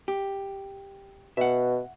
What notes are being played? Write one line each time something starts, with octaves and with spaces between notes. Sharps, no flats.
G4
B2 E5 F#5